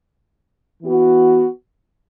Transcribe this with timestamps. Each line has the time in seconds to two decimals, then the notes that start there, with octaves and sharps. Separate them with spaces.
0.83 E3 B3 F#4